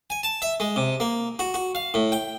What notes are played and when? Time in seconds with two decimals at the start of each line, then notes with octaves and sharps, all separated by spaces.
0.10 G#5
0.23 A5
0.42 E5
0.60 G#3
0.76 C3
1.00 A#3
1.39 F#4
1.54 F#4
1.75 F5
1.94 A2
2.12 G5